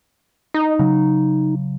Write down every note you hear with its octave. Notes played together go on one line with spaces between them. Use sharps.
D#4
C#3 F#3